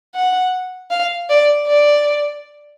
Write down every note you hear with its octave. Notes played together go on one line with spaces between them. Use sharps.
F#5
F5
D5
D5